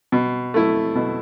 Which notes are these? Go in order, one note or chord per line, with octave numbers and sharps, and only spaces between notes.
B2
A3 E4
B2